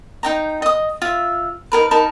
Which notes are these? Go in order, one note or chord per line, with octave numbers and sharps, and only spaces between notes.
D#4 G5 A#5
D#5 D#6
F4 E5
D#4 G#4 A#4 B4
D#4 A#4 A5 B5